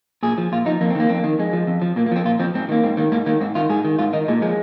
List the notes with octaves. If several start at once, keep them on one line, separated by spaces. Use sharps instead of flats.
A#2 G#4
F3
A#2 F4
F3 D#4
F2 A#3
C4
D#3 A#3
F2 C4
A#3
D#3
F2 G#3
F3
F2
F3
A#2 A#3
A#3
F3 C4
A#2 F4
F3 C4
G#2 C4
D#3 A#3
G#2 C4
D#3 A#3
G#2 A#3
D#3 A#3
G#2 C4
D#3 F4
G#2 G#4
D#3
G#2 F4
D#3 D#4
A#2 G#3
F3 G#3